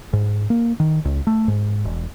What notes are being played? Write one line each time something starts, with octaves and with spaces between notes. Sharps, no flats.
G#2
A#3
D#3
C#2
A3
G#2
E1